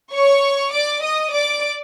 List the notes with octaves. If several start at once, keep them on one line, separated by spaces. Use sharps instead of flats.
C#5 C#6
D5 D6
D#5 D#6
D5 D6